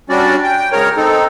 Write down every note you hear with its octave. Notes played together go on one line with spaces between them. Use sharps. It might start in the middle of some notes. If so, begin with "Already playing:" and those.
G3 C#4 D4 F#4 D5
G5
G#2 C#3 A#4 C#5 A#5
C4 D#4 A4